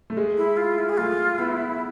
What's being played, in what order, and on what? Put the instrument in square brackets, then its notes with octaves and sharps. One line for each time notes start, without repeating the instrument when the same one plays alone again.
[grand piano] A3
G#3
[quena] E4
F4
E4
G#4
[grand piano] A3 [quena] F4
[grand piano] B3 [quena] E4